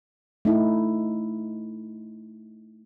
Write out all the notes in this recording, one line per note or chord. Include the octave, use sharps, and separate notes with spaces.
A3 D#4 E4